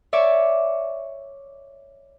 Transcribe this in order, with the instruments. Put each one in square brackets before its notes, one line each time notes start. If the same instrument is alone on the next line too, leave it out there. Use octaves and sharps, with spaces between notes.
[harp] C#5 D5 E5